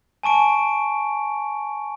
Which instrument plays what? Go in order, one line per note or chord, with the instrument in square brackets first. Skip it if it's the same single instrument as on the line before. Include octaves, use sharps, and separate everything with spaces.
[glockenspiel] G#5 A5 C#6 D7